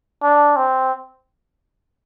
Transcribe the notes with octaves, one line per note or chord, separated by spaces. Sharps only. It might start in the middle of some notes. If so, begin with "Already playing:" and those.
D4
C4